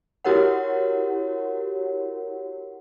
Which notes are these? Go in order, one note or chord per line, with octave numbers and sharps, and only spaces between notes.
E4 F#4 G4 A#4 C#5 F#5